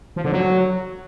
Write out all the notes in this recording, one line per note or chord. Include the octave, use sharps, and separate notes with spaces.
F3
D3
F#3